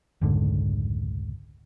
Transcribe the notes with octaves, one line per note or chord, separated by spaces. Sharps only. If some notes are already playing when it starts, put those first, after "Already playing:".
F1 C#2 G#2 D3